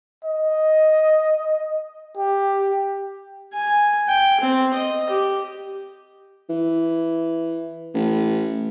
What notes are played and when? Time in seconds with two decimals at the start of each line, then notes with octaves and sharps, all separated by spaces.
0.24 D#5
2.17 G4
3.54 G#5
4.08 G5
4.40 C4
4.73 D#5
5.09 G4
6.49 E3
7.94 A1